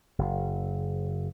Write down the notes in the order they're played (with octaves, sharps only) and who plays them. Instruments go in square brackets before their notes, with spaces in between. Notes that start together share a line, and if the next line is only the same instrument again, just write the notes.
[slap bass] F#1